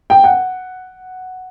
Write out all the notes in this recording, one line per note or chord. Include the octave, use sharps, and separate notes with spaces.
G5
F#5